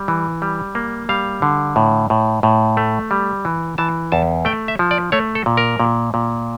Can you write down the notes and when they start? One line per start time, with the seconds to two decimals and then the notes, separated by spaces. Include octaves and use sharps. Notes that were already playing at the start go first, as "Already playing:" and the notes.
Already playing: G3
0.08 E3
0.42 G3
0.75 A#3
1.09 G3 F5
1.42 D3
1.76 A2
2.10 A2
2.43 A2
2.77 A3
3.11 G3
3.45 E3
3.78 E3 A5
4.12 E2 A5
4.45 A3 G5
4.68 E5
4.79 F3
4.91 D5
5.12 A3 C#5
5.35 A4
5.46 A#2
5.57 A#4
5.80 A#2
6.14 A#2